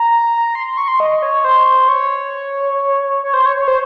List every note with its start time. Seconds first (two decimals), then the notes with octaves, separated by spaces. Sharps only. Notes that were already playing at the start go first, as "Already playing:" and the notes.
Already playing: A#5
0.55 C6
0.66 C6
0.77 C#6
0.88 C6
1.00 D#5
1.12 D#5
1.22 C#5
1.44 C5
1.89 C#5
3.23 C#5
3.34 C5
3.46 C#5
3.57 C#5
3.68 C5